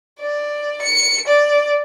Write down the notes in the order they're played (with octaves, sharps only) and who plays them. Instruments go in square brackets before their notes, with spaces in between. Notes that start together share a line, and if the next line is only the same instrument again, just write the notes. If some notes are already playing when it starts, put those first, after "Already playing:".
[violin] D5
C#7
D5